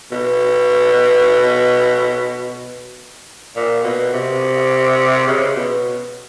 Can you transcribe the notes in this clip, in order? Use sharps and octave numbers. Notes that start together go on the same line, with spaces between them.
B2
A#2
B2
C3
C#3
B2